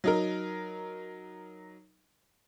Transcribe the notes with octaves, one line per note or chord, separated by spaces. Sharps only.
F#3 D#4 A#4